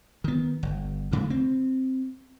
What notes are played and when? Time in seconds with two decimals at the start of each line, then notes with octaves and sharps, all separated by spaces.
0.24 D#3 B3
0.63 G1
1.12 D2 C#3 A3
1.30 C4